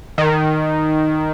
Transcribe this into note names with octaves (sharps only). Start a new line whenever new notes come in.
D#3